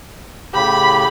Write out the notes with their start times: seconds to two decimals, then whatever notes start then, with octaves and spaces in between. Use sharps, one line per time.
0.54 A2 C#3 G4 B5